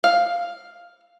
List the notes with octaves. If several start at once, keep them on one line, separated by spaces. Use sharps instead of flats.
F5